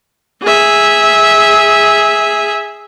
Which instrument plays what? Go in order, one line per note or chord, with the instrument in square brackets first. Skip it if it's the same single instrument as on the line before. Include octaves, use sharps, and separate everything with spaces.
[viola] G#4 E5